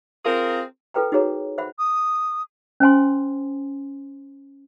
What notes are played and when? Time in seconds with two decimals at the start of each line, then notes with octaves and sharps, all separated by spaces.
0.25 C4 F4 G#4 A#4
0.94 F4 A4 B4 G5 A#5
1.12 D#4 F#4 G#4 C#5 A#5
1.58 C5 E5 F#5 B5
1.79 D#6
2.80 C#4 C5 G#5 C6